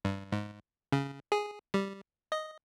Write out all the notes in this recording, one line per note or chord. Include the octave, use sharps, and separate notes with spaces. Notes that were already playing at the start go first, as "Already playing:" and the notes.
G2
G#2
C#3
G#4
G3
D#5